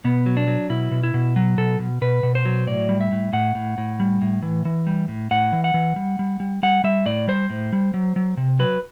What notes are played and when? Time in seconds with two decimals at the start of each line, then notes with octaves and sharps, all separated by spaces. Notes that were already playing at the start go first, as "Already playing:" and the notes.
0.04 B2 B3
0.26 F#3
0.37 D4
0.48 F#3
0.69 B2 E4
0.91 B2
1.03 E4
1.14 B2
1.36 F#3
1.58 B2 A4
1.79 B2
2.01 B2 B4
2.23 B2
2.35 C5
2.45 F#3
2.67 A2 D5
2.89 G3
3.01 E5
3.12 A2
3.33 A2 F#5
3.55 A2
3.78 A2
4.00 G3
4.22 A2
4.42 E3
4.65 E3
4.87 G3
5.08 A2
5.31 A2 F#5
5.53 E3
5.64 F#5
5.74 E3
5.96 G3
6.19 G3
6.40 G3
6.63 G3 F#5
6.84 G3 E5
7.06 A2 D5
7.28 G3 C5
7.50 A2
7.73 G3
7.94 F#3
8.16 F#3
8.37 C3
8.59 F#3 B4